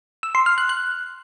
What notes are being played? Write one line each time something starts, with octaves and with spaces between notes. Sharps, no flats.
E6
C6
F6
F#6
F#6